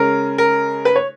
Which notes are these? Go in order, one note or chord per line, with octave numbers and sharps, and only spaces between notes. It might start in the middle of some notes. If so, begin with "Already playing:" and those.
Already playing: C#3 G#3 C#4 A#4
A#4
B4
C#5